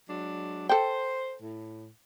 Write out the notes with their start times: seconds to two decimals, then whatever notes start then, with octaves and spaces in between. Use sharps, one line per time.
0.09 F#3 G#3 D4
0.69 A4 C5 G5
1.42 A2